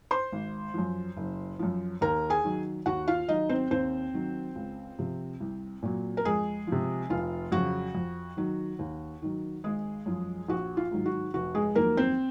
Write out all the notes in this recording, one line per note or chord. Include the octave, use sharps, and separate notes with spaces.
C5 C6
G#1
F#2 F3
F#1
F#2 F3
D#2 A#4 A#5
G#4 G#5
D#3 F#3
D#2 F#4 F#5
F4 F5
D#3 F#3 D#4 D#5
C4 C5
D#2 C4 C5
D#3 F#3
C#2
C3 F3
C2
A#2 F#3
A#4
F2 G#3 G#4
C3 F3
F1 F4
F2 C#3 F#3 F#4
F2
D#3 F#3
D#2
D#3 F#3
G#1 G#3 G#4
F#2 F3
A#1 F#4
F4
G#2 D#3 F#3
F#4
F1 F#4
G#3 G#4
F2 D#3 F#3 A#3 A#4
C4 C5